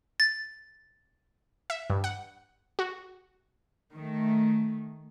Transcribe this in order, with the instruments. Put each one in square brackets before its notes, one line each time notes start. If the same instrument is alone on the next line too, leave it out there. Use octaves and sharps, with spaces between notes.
[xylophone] A6
[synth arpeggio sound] E5
G2
F#5
F#4
[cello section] D#3 A3